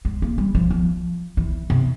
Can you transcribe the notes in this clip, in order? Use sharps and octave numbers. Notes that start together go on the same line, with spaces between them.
G#3
A#3
G3
F3
F3
E3
C3